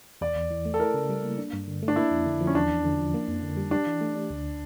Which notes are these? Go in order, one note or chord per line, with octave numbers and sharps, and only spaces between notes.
E2 D5
E2
E3
A3
A4
E4 A#4
C#3
G3
A#3
D4
G2
D3
A3
D4
A#3 E4
F2
D3
F3
C#4
E2 D4
E2
D3
F3
A#3
F2
D3
G3
D4 G4
E3
A3
D4
D2